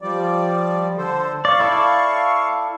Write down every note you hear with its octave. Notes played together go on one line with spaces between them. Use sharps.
F3 G3 D5
D3 A4 C5
D5 F5 C#6
E4 A4 D5